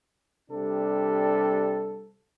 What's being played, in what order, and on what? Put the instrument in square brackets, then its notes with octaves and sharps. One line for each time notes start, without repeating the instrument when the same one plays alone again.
[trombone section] C3 G3 D4 A4